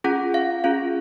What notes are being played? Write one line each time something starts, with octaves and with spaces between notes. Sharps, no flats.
C#4 F4 G#4 F#5
F5
C#4 F4 G#4 F5